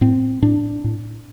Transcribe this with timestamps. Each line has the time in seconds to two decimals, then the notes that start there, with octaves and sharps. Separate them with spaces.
0.01 A2 C4
0.42 A2 D4
0.84 A2